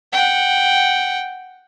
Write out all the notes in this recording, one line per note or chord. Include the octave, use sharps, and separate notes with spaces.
F#5 G5